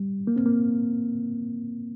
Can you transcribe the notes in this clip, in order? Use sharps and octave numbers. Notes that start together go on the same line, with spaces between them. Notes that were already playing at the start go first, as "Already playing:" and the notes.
Already playing: G3
A#3
C4
A#3